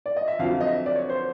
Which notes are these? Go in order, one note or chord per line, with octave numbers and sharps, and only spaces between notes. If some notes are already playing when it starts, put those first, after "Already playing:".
D5
D#5
E5
F2 D3 F#3 F5
D#5
E5
D5
C#5
C5